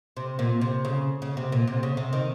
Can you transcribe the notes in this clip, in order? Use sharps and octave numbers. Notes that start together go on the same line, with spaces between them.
C3
A#2
C3
C#3
C#3
C3
A#2
C3
C#3
C3
D#3